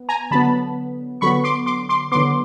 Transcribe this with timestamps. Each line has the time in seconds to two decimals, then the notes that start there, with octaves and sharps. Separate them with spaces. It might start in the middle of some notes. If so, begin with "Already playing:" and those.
Already playing: B3
0.09 G#5 A#5
0.31 D3 F#3 B3 A5 B5
1.21 D3 F#3 B3 B5 C#6
1.44 C6 D6
1.66 C6 D6
1.89 C6 D6
2.12 D3 F#3 B3 C6 D6